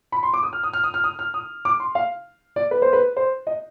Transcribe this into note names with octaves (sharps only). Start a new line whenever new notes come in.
B5
C6
D6
D#6
F6
D#6
F6
D#6
F6
D#6
F6
D#6
D6
C6
F5
D5
B4
C5
B4
C5
D#5